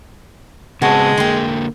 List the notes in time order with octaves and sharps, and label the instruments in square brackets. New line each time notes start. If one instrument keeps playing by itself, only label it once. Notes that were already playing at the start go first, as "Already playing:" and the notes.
[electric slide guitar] C#3 B3 C4 [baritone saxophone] G#3 [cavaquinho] F#4 C#5 A5
[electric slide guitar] D3 A#3 [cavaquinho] G5 C6